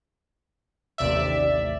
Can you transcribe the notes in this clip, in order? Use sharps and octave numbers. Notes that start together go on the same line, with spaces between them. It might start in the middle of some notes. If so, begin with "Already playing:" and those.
A1 D#2 C3 D5 E5